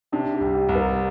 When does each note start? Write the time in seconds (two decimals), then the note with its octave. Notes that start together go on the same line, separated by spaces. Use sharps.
0.12 C3 D4
0.34 G4
0.40 C2
0.54 G4
0.69 C2
0.75 A#4